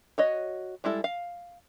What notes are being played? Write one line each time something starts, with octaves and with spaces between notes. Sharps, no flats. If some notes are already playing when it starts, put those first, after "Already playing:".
F#4 C#5 D#5
G3 G#3 E4 A4
F5